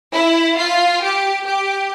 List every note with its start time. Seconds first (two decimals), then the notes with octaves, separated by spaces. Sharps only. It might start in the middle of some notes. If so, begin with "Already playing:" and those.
0.14 E4
0.57 F4
1.02 G4
1.46 G4